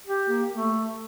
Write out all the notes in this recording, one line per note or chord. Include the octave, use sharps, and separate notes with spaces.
G4
A#3
A3